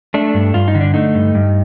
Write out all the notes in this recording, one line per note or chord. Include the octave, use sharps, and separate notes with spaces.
A3 D4
G2
G2 F4
D#4
D3
D4
A3 D#4
G2
G2